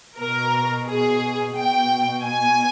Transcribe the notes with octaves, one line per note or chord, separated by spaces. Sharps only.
B2 A#4
G#4
B2 G5
G#5